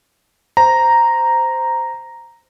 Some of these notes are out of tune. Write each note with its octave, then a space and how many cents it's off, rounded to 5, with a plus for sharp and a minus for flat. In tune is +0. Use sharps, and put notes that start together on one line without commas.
C5 -10 A#5 +0